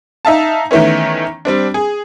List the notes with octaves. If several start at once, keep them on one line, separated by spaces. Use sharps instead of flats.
D#4 E5 F5 A5
D#3 E3 A3 B3 C#4
G3 C4 D4
G#4